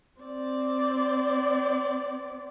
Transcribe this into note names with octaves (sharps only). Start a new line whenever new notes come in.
C4 D5